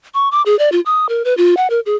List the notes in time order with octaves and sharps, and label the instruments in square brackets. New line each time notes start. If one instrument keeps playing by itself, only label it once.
[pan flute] C#6
D6
G#4
D5
F4
D#6
A#4
B4
F4
F#5
A#4
G#4